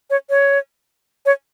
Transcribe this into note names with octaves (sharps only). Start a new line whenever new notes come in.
C#5
C#5
C#5